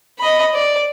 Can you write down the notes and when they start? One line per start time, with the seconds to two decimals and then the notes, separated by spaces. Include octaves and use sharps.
0.18 D#5 B5
0.55 D5